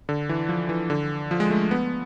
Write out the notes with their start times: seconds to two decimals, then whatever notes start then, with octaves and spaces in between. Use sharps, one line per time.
0.09 D3
0.29 E3
0.49 F3
0.69 E3
0.90 D3
1.31 F3
1.40 G#3
1.50 A3
1.71 B3